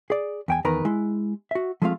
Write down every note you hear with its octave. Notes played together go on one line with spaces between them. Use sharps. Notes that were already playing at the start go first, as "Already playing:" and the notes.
G#4 D5
E2 G5 G#5
E2 D#3 A#4 B4 A#5
G#3 E4
F#4 E5
F3 G#3 A3 C4 F4 F5